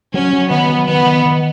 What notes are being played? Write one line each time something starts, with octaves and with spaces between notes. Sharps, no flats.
F#3 C#4
F#3
D#3 B3
F#3
D#3 B3
D#3
D#3